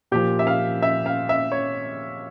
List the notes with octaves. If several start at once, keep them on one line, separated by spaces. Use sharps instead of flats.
A#2 F3 G4
E5
F5
E5
F5
E5
C#5